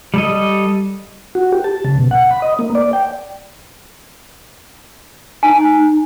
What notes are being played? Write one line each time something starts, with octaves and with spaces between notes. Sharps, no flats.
G3 A4 D#5
F#4
G4
A5
C#3
B2
F#5
B5
D#5
A#3
D5
G5
D#4 G#5